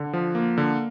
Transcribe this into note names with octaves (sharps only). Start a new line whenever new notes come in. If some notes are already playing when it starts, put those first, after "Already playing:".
Already playing: D3
F3
A#3
D3